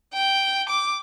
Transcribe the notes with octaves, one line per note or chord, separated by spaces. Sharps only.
G5
D6